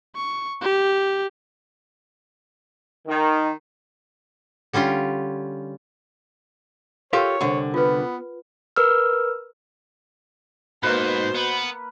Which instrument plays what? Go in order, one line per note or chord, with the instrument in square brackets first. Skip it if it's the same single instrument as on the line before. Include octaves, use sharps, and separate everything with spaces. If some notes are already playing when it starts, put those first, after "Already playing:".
[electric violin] C#6
G4
[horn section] D#3
[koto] D3 G3 C#4 F4 G4
[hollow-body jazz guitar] F4 G4 A4 [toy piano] A#4 [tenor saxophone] C#5
[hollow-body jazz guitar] C2 D3 [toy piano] F#5
[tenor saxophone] B3 [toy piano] F4 B4
[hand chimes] A#4 B4 E6 F6
[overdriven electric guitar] G#2 [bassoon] B2 [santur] A#3 B4 [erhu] C5
[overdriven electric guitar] B3